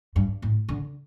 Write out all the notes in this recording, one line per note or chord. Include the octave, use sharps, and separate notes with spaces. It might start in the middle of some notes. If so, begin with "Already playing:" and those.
G2
A2
D3